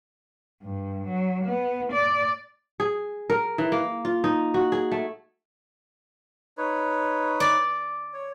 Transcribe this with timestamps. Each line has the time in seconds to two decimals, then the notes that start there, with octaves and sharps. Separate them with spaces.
0.63 G2
1.07 F#3
1.45 B3
1.92 D5
2.80 G#4
3.30 A#4
3.58 E3
3.72 A#3
4.05 F4
4.24 D#4
4.54 F#4
4.72 G#4
4.92 A3
6.58 D#4 B4 C#5
7.40 D5
8.13 C#5